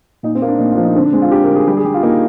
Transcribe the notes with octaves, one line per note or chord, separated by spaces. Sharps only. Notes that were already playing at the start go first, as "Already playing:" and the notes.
A#2 D#4
C4
A#3
D4
A#2 D#4
F4
F3
D#4
D3 C4
D4
G#3 C4
F4
D3 G4
A#4
D3
G#4
G3 G4
G#4
G3 G4
F4
A#3 D#4